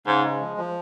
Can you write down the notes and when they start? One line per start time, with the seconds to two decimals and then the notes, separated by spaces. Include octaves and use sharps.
0.07 G#2 C#3
0.24 G#3
0.41 F3
0.57 F3